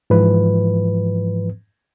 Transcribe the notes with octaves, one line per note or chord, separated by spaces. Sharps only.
G#2 E3 F3 B4